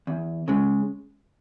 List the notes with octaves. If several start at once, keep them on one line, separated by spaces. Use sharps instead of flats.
E2
C#3 G#3